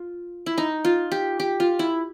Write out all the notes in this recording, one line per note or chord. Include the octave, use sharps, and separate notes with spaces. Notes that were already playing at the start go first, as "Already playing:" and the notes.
Already playing: F4
E4
D#4
F4
G4
G4
F4
E4